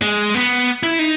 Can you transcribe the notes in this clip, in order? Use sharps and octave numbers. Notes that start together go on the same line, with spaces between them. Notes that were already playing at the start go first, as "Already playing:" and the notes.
G#3
B3
E4
D#4